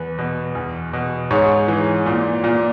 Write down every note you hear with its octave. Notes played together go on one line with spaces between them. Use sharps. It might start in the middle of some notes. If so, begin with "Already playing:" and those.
Already playing: E2 B4
B2
E2
B2
G#2 C#5
E3
A#2
A#2